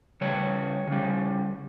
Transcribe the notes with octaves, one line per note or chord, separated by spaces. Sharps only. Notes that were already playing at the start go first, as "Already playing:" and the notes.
C#3 G3 C#5
C#3 G3